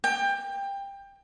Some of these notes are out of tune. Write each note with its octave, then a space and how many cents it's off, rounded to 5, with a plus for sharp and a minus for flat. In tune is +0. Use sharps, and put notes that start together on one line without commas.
G5 +20